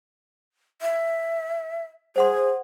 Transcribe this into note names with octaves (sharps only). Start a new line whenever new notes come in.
E5
G#4 C5 F#5 C6